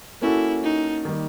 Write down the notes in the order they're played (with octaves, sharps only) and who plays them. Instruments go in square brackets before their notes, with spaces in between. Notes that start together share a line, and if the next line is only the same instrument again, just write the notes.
[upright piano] A#3 C#4 F#4 A4 [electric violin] E4
[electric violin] D#4
[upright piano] D#3 G3 A#3